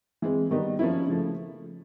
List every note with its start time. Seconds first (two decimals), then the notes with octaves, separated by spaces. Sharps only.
0.22 E3 G#3 C4
0.51 D#3 G3 B3 D#4
0.79 F3 A#3 C#4 E4
1.07 C#3 F3 A3